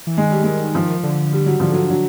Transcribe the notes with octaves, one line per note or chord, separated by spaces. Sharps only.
E3
D#3 G#3
G3
G#3
F3
D3
G3
F#3
D3 F3
F#3
F#3